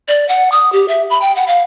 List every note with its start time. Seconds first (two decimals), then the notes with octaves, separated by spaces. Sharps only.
0.08 D5
0.29 F#5
0.52 D#6
0.72 G4
0.88 E5
1.10 B5
1.22 G5
1.36 F#5
1.47 F5